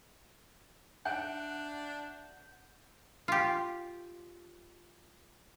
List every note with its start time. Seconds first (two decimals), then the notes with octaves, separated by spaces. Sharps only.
1.05 D4 E5 F#5 F#6 G6 D7
3.28 F4 G4